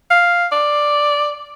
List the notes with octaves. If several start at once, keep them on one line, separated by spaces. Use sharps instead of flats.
F5
D5